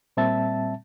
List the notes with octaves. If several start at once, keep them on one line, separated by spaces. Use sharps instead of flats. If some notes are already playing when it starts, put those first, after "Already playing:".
A#2 G3 C4 E5 A5 A6